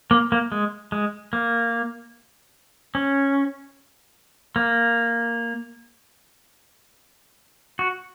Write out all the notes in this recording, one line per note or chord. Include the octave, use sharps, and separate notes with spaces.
A#3
A#3
G#3
G#3
A#3
C#4
A#3
F#4